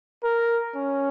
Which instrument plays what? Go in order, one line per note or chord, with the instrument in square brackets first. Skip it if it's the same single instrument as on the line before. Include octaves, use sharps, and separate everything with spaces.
[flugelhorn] A#4
C#4